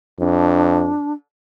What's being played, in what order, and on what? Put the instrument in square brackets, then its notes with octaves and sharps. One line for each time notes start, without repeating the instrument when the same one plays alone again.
[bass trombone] F2 [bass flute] D4